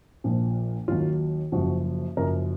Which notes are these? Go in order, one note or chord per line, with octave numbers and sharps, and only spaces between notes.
A#1 A#2 F3
D#2 D#3 F#3 F4
F#1 F#2 F3 F#4
F#1 F#2 F3 A#4